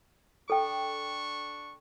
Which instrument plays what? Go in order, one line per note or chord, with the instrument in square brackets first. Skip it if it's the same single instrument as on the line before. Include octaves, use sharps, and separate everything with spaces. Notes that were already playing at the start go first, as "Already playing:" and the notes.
[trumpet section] D4 C#6 [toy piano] A4 G5